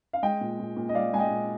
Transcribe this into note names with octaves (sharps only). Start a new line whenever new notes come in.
F5
G#3 D#5 G5
A#2
A#2
A#2
D#5
G#3 D5 F5
G#3 G#5
D#5 G5
A#2